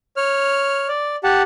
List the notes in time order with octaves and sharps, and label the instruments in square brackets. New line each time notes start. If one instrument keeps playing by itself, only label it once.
[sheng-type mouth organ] C#5 F6
D5
G4 F#5 A5